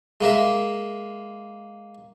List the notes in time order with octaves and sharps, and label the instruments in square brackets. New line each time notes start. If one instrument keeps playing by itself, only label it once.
[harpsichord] G#3 A#3 A#4 E5